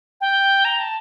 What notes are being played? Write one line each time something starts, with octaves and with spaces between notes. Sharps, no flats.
G5
A#5
A5